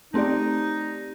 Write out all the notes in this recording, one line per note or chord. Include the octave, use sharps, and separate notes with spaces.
A3 C4 D#4 G4 D5